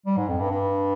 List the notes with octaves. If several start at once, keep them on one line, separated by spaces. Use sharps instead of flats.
G3
G#2
F2
G2
G2